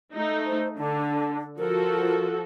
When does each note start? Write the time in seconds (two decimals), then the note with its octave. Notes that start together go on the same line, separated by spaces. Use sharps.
0.13 A3 D#4
0.46 C5
0.78 D3 D4
1.58 F3 F#4 A4 A#4